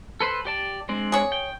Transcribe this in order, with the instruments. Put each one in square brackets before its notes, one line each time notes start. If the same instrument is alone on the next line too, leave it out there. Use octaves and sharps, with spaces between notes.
[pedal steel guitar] A4 B4 C5
G4 D5 A5
G#3 C4 D4
[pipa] G#4 C#5
[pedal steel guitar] G5